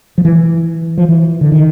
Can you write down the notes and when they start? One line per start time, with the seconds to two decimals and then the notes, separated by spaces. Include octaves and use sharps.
0.18 F3
0.25 E3
0.98 F3
1.09 E3
1.41 D3
1.52 D#3